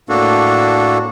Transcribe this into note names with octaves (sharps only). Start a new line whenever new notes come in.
A2 A#3 D4 F#4 A4